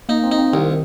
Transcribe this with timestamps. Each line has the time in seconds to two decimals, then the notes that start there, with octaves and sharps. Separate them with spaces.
0.09 A#3 D#4
0.23 C4
0.32 D#4
0.38 C4
0.53 C2 D#3